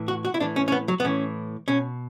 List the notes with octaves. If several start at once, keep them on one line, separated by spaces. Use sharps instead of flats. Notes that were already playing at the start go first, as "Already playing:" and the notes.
Already playing: A2 E3
F#4
F#4
E4
A2 E3 D4
C#4
C#4
B3
F#3
B3
A2 E3 C#4
B2 C#4